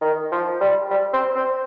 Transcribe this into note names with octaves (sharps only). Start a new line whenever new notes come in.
D#3
F3
G3
G3
C4
C4